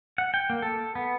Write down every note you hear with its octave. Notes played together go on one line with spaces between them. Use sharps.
F#5
G5
A#3
A4
B3